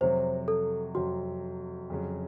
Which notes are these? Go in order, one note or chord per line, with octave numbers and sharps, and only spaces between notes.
F2 C3 F#3 C5
A4
F2 C3 F#3 F#4
F2 C#3 F#3